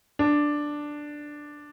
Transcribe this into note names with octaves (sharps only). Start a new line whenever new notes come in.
D4